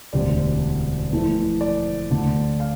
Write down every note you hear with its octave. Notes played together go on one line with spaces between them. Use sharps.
E1 D2 C3 G3 D5
F2 E3 A3
D5
D2 D3 A3
F5